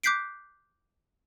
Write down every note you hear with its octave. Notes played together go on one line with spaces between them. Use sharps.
D6 F#6 G6 B6 C7 D7